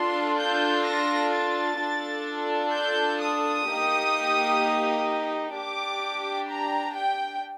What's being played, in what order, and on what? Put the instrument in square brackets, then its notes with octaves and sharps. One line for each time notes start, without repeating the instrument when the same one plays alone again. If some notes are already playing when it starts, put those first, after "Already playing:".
Already playing: [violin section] D4 F4 A4 C6
G6
A#6
A6
D4 F4 A4
G6
D#6
A#3 D#4 G4
D4 G4 D6
A#5
G5